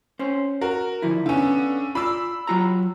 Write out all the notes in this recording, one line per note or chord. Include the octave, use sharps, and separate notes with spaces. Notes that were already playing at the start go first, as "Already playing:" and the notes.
C#4 C5
F#4 A#4
D3 F3 E4
D3 B3 C#4 F5
F4 D5 B5 E6
F#3 F4 A#5